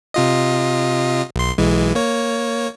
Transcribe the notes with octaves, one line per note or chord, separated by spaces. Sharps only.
C3 F4 D#5
B1 C6
B1 E3 G#3
A#3 C#5